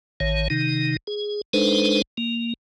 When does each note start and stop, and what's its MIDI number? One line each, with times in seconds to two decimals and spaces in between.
0.20 0.48 33
0.20 0.48 51
0.20 0.48 73
0.50 0.97 48
0.50 0.97 51
0.50 0.97 63
1.07 1.41 68
1.53 2.02 56
1.53 2.02 62
1.53 2.02 63
1.53 2.02 69
1.53 2.02 71
1.53 2.02 72
2.18 2.54 58